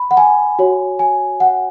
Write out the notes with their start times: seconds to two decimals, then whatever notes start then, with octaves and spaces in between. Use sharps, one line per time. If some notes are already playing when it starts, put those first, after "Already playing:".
Already playing: B5
0.11 F#5
0.17 G#5
0.59 F#4 C#5
0.99 G#5
1.40 F#5